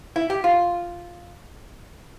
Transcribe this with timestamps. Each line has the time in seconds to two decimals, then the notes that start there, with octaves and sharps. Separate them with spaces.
0.16 E4
0.30 G4
0.44 F4